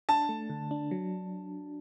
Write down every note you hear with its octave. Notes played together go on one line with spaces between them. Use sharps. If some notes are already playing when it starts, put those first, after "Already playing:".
D4 A5
A3
D3
D4
F#3